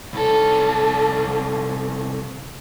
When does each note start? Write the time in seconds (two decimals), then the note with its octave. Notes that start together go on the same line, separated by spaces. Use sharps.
0.13 C2 A4